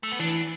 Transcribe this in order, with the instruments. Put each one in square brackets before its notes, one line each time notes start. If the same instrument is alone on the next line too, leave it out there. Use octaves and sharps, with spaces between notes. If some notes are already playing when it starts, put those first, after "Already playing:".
[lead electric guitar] A3
B3
[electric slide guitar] E3 [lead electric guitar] D4